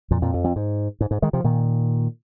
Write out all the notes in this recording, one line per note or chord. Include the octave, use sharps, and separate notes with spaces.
F2 A#2
F2 A#2
F2
F2
G#2
G#2
G#2
D#3 G#3
C3 F3
A#2 D#3